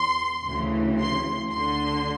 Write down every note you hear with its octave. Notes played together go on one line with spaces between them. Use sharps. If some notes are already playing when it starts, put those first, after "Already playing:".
Already playing: E2 C6
D2 C#3 E3
C6
D2 D3 C6